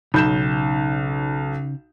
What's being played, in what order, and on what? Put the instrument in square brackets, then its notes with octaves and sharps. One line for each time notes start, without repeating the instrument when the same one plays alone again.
[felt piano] B1 G6 E7 [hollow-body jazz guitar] C#3 D#4 B5